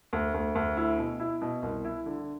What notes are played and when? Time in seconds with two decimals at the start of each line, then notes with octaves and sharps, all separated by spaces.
0.13 D2
0.34 D2
0.55 D2
0.77 E4
0.98 B2
1.20 E4
1.42 B2
1.63 C2
1.85 E4
2.06 D3